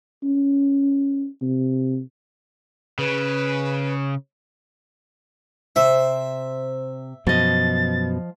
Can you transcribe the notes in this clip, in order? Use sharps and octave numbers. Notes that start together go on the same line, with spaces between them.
C#4
C3
C#3 B4
C3 C5 E5
F#2 B2 F3 D#5 A6